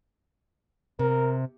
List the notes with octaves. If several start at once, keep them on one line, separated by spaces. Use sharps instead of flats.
C3 A#4